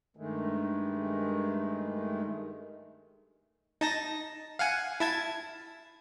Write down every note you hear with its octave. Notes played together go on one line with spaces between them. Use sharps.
G2 D#3 G#3 A3
D#4 A5 A#6
F5 F#5 G#5
E4 A5 G#6